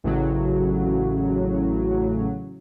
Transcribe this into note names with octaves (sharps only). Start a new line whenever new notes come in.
A1 A2 C#3 F#3